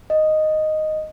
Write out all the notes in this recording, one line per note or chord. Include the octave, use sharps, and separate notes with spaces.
D#5